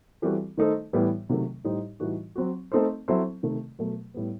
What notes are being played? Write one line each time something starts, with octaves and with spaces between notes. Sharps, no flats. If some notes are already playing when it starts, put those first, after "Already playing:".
E3 G3 C4 F#4 A4
D#3 A3 D#4 A4 C5
A2 E3 G3 B3
C3 D#3 F#3 A3
A2 G3 D#4 G4 C5
A2 E3 G3 D#4 F#4
F#3 C4 F#4
A3 C4 D#4 A4 C5
F#3 C4 E4 A4 C5
C3 D#3 A3
B2 F#3 A3
A2 G3 B3